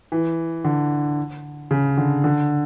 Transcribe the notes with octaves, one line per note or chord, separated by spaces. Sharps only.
E3
D3
C#3
D3
D3